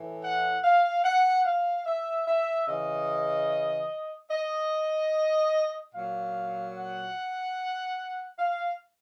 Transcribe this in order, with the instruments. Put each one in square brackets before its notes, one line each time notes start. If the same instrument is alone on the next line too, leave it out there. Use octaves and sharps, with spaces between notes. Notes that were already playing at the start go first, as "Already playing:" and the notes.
Already playing: [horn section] A2 E3
F#5
F5
F#5
F5
E5
E5
C#3 E3 D#5
D#5
A#2 F#3 F5
F#5
F5